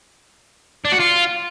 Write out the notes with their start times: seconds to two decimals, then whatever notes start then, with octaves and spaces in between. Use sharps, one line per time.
0.85 D4
0.92 F#4
1.00 F4